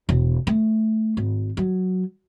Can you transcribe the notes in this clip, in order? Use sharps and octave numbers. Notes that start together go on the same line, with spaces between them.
E1
A3
G#1
F#3